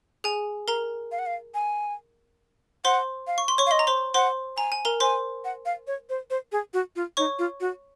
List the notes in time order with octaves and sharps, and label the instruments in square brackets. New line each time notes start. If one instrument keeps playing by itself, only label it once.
[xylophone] G#4 G#5
A#4 A#5
[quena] F5
F#5
F5
G#5
[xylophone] C5 C6 [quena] F#5
[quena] F5
[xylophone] C#6
C6
C#5 C#6
[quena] F5
[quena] D#5 [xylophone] C6
[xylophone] A#5
C5 C6
[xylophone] C5 C6 [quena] F#5
[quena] G#5 [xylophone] A#5
[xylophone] G#5
A#4 A#5
[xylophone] C5 C6 [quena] G#5
[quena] F#5
F5
C#5
C5
C5
G#4
F#4
F4
[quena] D#4 [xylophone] C#5 C#6
[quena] F4
F#4